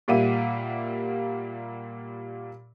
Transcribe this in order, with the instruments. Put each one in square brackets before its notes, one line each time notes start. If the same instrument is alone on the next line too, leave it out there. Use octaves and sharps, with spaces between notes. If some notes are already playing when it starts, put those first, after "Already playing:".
[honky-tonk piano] A#2 G3 A#3 E5 F#5 D#7